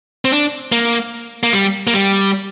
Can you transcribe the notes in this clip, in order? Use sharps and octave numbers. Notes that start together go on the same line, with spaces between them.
C4
D4
A#3
A#3
G3
A#3
G3